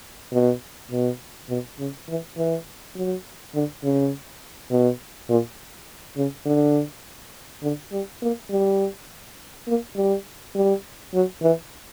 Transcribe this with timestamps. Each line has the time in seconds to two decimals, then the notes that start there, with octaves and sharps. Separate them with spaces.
0.33 B2
0.91 B2
1.49 B2
1.79 C#3
2.09 E3
2.37 E3
2.96 F#3
3.55 D3
3.83 C#3
4.71 B2
5.30 A#2
6.17 C#3
6.46 D3
7.62 D3
7.92 G3
8.22 A#3
8.50 G3
9.68 A#3
9.96 G3
10.55 G3
11.14 F#3
11.42 E3